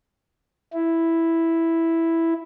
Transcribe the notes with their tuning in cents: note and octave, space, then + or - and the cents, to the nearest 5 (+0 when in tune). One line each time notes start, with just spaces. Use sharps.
E4 +0